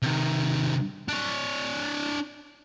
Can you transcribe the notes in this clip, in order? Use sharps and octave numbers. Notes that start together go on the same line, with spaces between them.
C3 D#3
D4 C#5